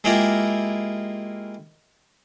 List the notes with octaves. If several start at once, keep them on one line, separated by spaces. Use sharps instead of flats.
G#3 A#3 E4 F4 G4 A#4